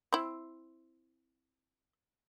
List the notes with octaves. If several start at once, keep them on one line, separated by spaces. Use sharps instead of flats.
C4 E4